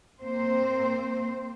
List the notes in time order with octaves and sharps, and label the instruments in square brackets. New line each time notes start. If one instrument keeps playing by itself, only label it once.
[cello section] A#3 C4 C5